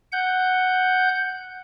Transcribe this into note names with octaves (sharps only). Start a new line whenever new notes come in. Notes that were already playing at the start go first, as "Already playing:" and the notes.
F#5 G6